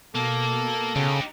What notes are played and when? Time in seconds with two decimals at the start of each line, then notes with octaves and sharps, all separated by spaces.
0.14 B2 A#3 A4
0.96 C#3 D#4 G4